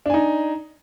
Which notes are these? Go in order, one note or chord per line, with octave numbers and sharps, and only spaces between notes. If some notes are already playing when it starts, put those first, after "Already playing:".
D4 D#4 G#5